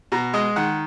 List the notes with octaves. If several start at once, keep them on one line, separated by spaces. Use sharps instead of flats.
B2 A#5
G#3 D#5
D#3 F#5